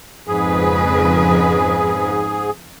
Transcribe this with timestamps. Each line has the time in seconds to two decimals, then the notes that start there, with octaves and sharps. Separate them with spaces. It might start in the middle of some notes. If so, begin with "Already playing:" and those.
0.27 F2 G#2 C#3 G#4 B4